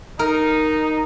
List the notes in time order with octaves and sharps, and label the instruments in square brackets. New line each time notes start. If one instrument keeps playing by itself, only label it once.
[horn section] D#4 [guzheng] A#4